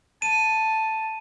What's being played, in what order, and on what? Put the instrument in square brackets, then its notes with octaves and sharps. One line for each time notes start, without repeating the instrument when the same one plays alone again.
[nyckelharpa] A5 [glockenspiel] D#7